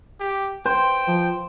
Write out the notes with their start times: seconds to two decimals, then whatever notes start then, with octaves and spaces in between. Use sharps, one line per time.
0.20 G4
0.66 C5 G5
1.08 F3